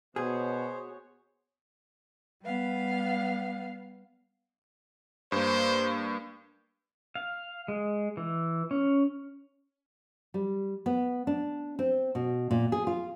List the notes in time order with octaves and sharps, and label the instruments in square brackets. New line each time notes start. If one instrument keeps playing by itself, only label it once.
[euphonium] B2 [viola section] B3 F#4 C#5 [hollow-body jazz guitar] G#4 [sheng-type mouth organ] C5
[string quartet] G3 B3 F5
[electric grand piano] G2 A#3 [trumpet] C5
[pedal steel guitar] F5
G#3
E3
C#4
[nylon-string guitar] G3
B3
D4
C4
B2
A#2
G#4
F4